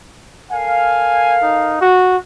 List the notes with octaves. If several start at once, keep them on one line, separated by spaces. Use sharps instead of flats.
A4 A#4 F5 G#5
D#4
F#4